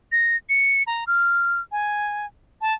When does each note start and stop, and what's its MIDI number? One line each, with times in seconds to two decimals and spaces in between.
0.12 0.37 94
0.49 0.83 97
0.87 1.04 82
1.07 1.60 89
1.72 2.26 80
2.61 2.74 81